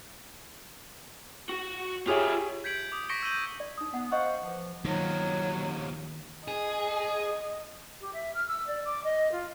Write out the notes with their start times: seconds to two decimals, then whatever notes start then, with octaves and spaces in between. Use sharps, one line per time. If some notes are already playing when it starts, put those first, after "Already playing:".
1.49 F#4
2.07 F4 G4 G#4 C#5 E5
2.64 G6 G#6 B6 C#7 D7 F#7
2.92 D6 D#6
3.09 C#6 A#6 B6 C#7 D7 G7
3.22 E6 G6 D#7 F#7 G7
3.60 D5
3.77 D#4 D#6
3.94 B3 F#5
4.12 C5 D#5 F5 F#5 C#6
4.43 E3 F3
4.85 D#2 D#3 F3 F#3
6.48 G#4 D#5
8.01 G4
8.13 E5
8.35 F6
8.48 E6
8.67 D5
8.85 D6
9.04 D#5
9.32 F4